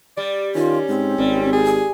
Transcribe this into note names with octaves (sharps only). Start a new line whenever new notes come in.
G3 D5
D#3 C#4 F4
G#2 C4
G#1 G3
G#4
G#5